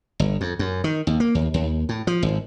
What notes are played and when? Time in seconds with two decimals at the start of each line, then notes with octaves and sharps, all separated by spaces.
0.20 G1
0.41 F2
0.59 F#2
0.84 D#3
1.07 D#2
1.20 A#3
1.35 D#2
1.54 D#2
1.89 A2
2.07 F3
2.23 G#1